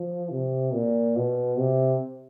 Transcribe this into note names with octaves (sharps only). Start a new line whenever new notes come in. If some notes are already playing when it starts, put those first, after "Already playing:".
Already playing: F3
C3
A#2
B2
C3